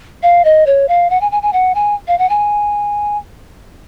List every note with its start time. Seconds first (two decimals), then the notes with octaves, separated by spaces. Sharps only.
0.23 F5
0.45 D#5
0.66 C#5
0.88 F5
1.10 F#5
1.21 G#5
1.32 G#5
1.43 G#5
1.53 F#5
1.75 G#5
2.08 F5
2.19 F#5
2.29 G#5